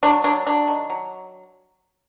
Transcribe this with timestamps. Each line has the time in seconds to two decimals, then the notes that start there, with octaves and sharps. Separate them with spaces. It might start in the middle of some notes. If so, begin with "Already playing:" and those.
0.03 F#3 D4
0.24 F#3 D4
0.46 F#3 D4
0.68 D#3
0.90 F#3